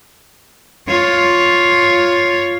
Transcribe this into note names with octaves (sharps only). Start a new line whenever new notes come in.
F4 C#5